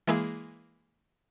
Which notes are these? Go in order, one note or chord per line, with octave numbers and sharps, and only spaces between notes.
E3 G#3 A#3 E4 G#4